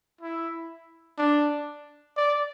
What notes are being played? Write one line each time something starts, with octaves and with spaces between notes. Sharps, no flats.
E4
D4
D5